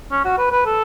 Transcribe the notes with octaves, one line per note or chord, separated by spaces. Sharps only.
C#4
F#4
B4
B4
A4